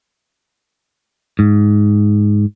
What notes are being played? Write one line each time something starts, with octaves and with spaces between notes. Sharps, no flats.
G#2